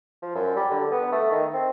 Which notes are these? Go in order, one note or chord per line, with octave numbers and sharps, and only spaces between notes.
F3
F#2
G3
D3
B3
A3
D#3
C4